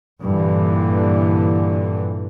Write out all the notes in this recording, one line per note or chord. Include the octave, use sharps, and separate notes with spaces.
G2 A#2 D3 E3